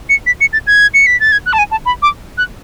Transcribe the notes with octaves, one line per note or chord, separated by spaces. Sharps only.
C#7
B6
C#7
A6
G#6
C#7
B6
A6
G#6
F#6
A5
G#5
A5
B5
D6
F#6